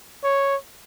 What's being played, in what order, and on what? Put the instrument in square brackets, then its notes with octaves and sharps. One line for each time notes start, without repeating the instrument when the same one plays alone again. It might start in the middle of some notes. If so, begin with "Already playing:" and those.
[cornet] C#5